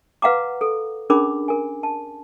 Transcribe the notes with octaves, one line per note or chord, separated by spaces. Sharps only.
B4 F5 F#5 A#5 D6
A4
C#4 D4 G#4 A#4 B5 D6
A#4 G#5
A5